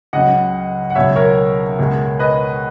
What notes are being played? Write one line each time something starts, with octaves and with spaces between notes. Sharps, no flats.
C#2 C#3 F#3 D#5 F#5
F#5
C#2 B2 F#3 C#5 E5
A#4 C#5
C#2 B2 G#3
B4 D#5